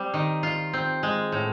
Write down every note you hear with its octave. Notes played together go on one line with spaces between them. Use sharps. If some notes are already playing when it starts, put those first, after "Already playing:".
Already playing: G3 C4
D#3
F4
C4
G#3
A2